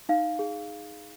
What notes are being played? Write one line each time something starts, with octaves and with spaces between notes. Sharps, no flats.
D#4 F5
G#4